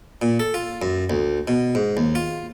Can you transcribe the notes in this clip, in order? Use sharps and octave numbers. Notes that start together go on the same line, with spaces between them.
A#2
A4
F4
F#2
D2
B2
G#2
D#2
F4